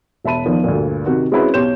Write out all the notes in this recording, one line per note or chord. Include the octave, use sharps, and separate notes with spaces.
E1 E5 A5 B5 D#7
E2 D#3 F3
D2 G2 A#2
C3 D#3 F#4
G#3 C4 C#4 E4 F#4 B4
B1 G4 C#5 C6 G6 E7